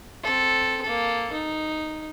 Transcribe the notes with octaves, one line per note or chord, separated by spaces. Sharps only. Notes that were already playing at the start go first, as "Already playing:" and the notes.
C4 A4
A#3 A4
D#4